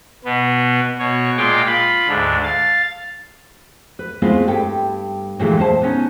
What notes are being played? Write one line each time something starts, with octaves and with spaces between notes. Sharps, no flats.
B2 B3
B2 C#5
A#2 G#3 F4 G5 D6 F6
F4 B5
D2 G#2 D3
F5 A6
B4
G#3 A3 B3 C4 E4 F4
G2 G3 A4 G5
G2 A#2 D3 E3 G#3 A3
A#2 C5 A5
B3 C#4 D#4